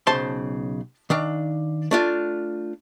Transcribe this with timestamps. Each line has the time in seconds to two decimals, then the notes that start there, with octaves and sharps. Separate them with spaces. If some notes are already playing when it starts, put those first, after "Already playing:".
0.07 B1 C#3 C5 A5 C6
1.10 D#3 D4 F5
1.91 A3 D4 F4